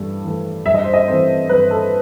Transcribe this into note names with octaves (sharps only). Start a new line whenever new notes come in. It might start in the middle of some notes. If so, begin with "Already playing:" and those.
Already playing: G2 E3 A3
E3 A3
G2 E5
D#5
C5
D#5
E3 A3 C4 C5
G2 B4
A4